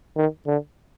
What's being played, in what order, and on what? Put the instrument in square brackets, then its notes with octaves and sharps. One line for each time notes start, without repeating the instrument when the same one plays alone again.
[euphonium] D#3
D3